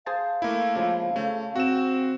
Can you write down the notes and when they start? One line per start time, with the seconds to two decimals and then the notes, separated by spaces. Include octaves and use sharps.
0.06 G#4 C5 F5 A5
0.42 A3 A#3 E4
0.75 C#3 F3 G#3
1.16 C#3 A3
1.56 C4 F#4 E7